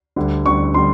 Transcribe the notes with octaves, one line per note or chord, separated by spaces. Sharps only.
D2 D3 G3
D2 D3 G3 C#6
D3 G3 C6